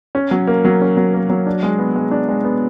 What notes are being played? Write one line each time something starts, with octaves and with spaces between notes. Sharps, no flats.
C#4
F#3
A#3
F#3
C#4
F#3
A#3
F#3
D4
G#3
B3
G#3
D4
G#3
B3